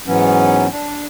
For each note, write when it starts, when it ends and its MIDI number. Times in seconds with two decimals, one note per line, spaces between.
0.07 0.67 44
0.07 0.67 52
0.07 0.67 54
0.07 0.67 59
0.07 0.67 61
0.72 1.06 62